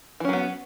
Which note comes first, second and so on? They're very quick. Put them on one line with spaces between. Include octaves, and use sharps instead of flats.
E3 C#4 F#3 B3